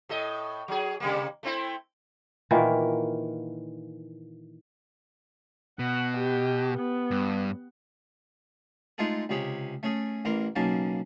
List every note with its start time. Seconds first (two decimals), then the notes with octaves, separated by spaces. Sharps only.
0.09 A2 A4 D#5
0.68 F#3 G#4
1.00 C3 G3 A#3
1.43 A3 C4 E4
2.51 A#2 D#3 E3 A#3
5.79 B2 F#5
6.17 G4
6.76 B3
7.11 G2
8.98 G#3 A3 D#4 F4 G#4 A4
9.29 C#2 C3 G#4 C#5 B5
9.83 A3 C#4 G#4
10.25 A1 E3 A#4 C6
10.56 B1 C#3 A#3 C#4 A5